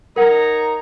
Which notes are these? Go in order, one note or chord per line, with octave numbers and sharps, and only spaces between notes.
D#4 A#4 C#5 F#5 A#5